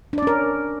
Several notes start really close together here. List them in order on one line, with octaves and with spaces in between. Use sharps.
D4 D5 C#4 A#4